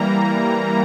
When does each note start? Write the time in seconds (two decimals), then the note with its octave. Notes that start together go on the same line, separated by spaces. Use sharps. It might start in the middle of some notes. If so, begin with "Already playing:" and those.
Already playing: E3 G3 A#3 A#5